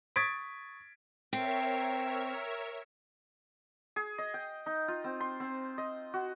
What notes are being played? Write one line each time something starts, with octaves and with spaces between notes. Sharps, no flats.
C#6 D#6 G#6 A6 B6 D7
C4 A#4 C#5 E5
G#4
D#5
G5
D#4
F4
C4
C6
C4
D#5
F#4